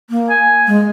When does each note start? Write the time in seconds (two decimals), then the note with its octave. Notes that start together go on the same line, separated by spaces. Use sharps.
0.10 A#3
0.29 G#5
0.67 G#3